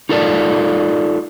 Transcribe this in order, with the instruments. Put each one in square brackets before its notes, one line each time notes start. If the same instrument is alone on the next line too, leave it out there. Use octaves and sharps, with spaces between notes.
[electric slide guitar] D#4 F4 A4 A#4 D5